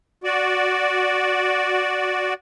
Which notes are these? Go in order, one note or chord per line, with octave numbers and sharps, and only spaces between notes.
F#4 D5